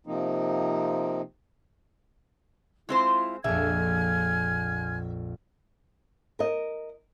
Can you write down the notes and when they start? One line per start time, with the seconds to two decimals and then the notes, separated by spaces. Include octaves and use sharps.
0.07 C3 F3 A#3 C4 D#4
2.89 G#3 C4 E4 F4 C5
3.44 A#1 F2 E5 G#5 F6 G#6
6.39 A#4 D#5